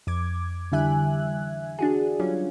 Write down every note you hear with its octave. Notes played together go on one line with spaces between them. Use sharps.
F2 D6 G#6
D3 E3 G3 E5 G#5 F#6
D4 F#4 G#4
F#3 G3 C#4 F4